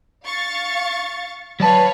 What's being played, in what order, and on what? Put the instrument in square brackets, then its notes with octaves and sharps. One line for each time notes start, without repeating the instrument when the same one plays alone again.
[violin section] F5 C#6 A6
[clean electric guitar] F#3 D5 A5 [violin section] B4 C#5 F5